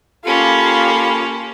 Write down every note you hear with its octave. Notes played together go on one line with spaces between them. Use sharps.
A#3 C#4 F4 G4 A4 F5 B5